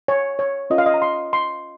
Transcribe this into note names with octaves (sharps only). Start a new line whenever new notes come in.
C#5
C#5
C#4 F4 A#4 C#5 D#5
F5
D#5
A#5
C6
C6